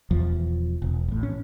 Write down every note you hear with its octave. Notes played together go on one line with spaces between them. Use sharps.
E1 E2 F3
E1
A1 A2
C#4